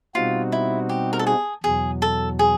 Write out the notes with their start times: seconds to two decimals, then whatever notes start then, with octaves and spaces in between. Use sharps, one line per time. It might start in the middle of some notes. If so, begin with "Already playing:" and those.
0.15 B2 G3 C4 D#4 F4 F#4
0.52 E4
0.89 G4
1.13 A#4
1.19 A4
1.27 G#4
1.64 E2 B2 F#3 G#4
2.02 A4
2.39 G#4